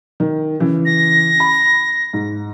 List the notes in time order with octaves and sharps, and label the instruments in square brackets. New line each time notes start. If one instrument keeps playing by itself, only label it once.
[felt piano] D#3
C#3 E3
[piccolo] A#6
[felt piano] B5
G#2